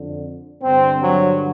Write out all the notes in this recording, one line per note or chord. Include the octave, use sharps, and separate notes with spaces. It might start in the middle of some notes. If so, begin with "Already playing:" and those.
Already playing: F2 D3
G2 D3 C4
F#3